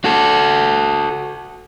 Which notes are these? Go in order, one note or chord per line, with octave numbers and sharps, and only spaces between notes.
F#4 A4